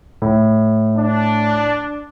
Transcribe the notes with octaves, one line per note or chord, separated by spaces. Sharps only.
A2
D4